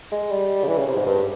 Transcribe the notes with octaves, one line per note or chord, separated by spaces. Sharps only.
G#3
G3
C#3
E3
C#3
C3
G#2
G2